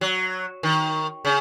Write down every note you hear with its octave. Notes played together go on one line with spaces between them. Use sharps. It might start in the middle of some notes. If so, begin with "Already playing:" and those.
F#3
D#3
C#3